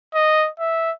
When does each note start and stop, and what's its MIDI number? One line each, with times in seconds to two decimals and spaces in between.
0.15 0.49 75
0.60 0.92 76